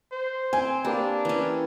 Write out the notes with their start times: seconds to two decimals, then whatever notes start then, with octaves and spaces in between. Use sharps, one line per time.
0.12 C5
0.53 C4 G#5
0.84 A#3 D4 G4 B4
1.25 E3 C#4